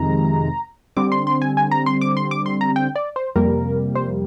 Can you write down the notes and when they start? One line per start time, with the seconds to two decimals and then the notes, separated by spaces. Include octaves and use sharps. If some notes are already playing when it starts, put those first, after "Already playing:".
Already playing: F2 C3 D#3 G#3 A#5
0.97 D3 G3 C4 D6
1.12 C6
1.27 C6
1.42 G#5
1.57 G#5
1.71 A#5
1.86 C6
2.01 D6
2.17 C6
2.31 D6
2.46 C6
2.61 A#5
2.76 G5
2.96 D5
3.16 C5
3.35 F2 C3 G3 A#3 A#4
3.95 C5